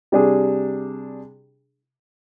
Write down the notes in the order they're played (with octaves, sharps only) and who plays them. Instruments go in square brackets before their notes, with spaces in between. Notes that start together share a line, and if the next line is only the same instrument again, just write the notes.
[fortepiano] C3 G3 D4 G#4